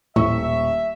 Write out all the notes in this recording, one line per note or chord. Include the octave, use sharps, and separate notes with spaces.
D#1 A2 E5 C#6